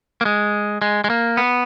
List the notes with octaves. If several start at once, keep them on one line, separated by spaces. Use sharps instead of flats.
A#3
G#3
G#3
G#3
A#3
B3